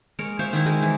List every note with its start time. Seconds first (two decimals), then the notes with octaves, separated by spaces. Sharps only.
0.19 G#3 A#4 C#5
0.39 C5 C#5 E5 F5
0.53 D#3 E4
0.66 G#3 G#4 A#4
0.82 E3